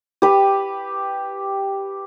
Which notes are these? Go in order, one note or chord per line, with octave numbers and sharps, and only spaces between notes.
G4 B4